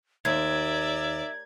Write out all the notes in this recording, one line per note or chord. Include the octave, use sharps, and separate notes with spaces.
D#2 A#4 D5 E5 G#6